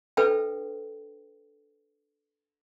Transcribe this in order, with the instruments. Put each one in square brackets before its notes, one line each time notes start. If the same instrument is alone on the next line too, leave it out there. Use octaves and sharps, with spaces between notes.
[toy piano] D4 A4 B4 C5 E5 G5